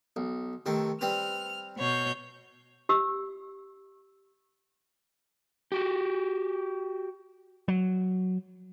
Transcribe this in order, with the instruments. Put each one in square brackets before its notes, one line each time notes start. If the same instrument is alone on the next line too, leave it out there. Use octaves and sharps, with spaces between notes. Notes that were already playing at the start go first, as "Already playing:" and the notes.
[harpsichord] B1
C3 D#3 A3
[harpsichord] G3 C4 B4 [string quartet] F6
[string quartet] B2 C#5 G6
[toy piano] G4 E6
[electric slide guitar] F#4 G4
[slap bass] F#3